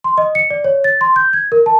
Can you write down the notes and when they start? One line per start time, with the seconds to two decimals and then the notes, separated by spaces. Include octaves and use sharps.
0.04 C6
0.18 D#5
0.35 C#7
0.50 D5
0.64 C#5
0.84 A6
1.01 C6
1.16 G6
1.33 G#6
1.52 A#4
1.66 A5